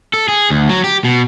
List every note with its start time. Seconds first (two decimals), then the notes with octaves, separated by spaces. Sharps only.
0.14 A4
0.28 G#4
0.50 D2
0.69 F#3
0.84 G4
1.05 B2